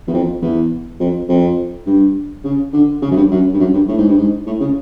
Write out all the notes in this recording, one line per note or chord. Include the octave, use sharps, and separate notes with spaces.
E2
F2
E2
F2
F2
G2
C#3
D3
C#3
F#2
G2
F#2
G2
F#2
G2
A2
G#2
G2
G#2
A2
C#3